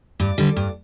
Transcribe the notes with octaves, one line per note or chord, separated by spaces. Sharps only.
G2 D5
D3 G3
G2